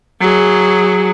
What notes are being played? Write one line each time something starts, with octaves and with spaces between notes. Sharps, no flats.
F#3 G#4